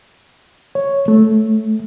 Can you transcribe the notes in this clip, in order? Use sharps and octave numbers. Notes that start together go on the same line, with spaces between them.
C#5
A3